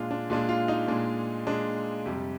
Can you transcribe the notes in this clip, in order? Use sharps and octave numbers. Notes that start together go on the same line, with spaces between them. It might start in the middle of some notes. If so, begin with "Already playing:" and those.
Already playing: A#2 G#3 D4 F4
D4
A#2 G#3 D4 F4
F4
D#4
A#2 G#3 D4
A#2 G#3 D4
F2 C3 G3